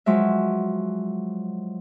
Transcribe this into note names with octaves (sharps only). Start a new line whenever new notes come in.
F3 F#3 G#3 E5